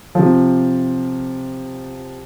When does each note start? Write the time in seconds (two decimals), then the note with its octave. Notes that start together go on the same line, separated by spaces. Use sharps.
0.15 C3 F3